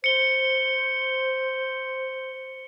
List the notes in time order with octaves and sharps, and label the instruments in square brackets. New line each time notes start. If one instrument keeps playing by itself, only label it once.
[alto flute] C5 [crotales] C#7 G7